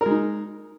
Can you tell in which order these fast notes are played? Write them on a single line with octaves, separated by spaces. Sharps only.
A#4 G#3 D#4